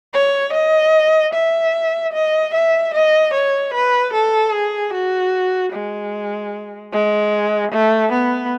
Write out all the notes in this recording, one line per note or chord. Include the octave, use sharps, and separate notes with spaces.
C#5
D#5
E5
D#5
E5
D#5
C#5
B4
A4
G#4
F#4
G#3
G#3
A3
B3